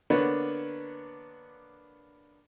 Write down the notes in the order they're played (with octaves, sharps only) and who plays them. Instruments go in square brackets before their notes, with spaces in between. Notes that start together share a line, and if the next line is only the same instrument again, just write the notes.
[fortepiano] D3 A#3 B3 D4 B4 C#5